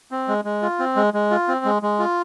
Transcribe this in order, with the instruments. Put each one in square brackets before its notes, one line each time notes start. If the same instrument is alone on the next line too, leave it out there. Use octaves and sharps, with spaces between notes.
[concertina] C4
G#3
G#3
F4
C4
G#3
G#3
F4
C4
G#3
G#3
F4